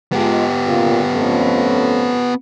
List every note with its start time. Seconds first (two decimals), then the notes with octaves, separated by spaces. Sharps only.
0.12 G#3 B3 F4 G4
0.65 A#2 C#3 F4
1.12 F2 A3 C#4